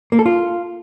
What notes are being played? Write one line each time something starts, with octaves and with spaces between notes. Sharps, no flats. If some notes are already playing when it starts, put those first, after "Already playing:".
A#3
A4
F4